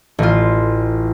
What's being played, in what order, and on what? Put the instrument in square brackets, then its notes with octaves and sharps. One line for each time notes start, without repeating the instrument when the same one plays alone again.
[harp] A1 F4